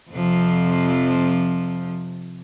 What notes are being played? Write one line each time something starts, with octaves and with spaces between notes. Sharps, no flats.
F2 C3 F3